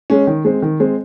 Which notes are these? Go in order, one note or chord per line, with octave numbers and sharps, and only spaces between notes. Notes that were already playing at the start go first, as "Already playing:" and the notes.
G#3 C#4
D#3
G#3 C4
D#3
G#3 C4